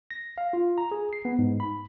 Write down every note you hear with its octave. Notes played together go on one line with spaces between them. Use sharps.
A#6
F5
F4
A#5
G#4
C7
B3
G#2
B5